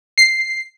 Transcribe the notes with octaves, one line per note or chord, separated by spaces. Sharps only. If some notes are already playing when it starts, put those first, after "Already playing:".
C7